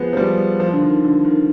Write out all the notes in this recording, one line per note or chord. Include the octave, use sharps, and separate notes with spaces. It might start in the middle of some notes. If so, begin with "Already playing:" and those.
Already playing: F3 G#3 B3
F3
G3
F3
D3
D#3
D3
D#3